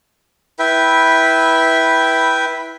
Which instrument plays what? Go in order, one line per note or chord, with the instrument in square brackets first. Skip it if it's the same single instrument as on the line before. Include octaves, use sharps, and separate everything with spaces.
[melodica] E4 B4 E5 G5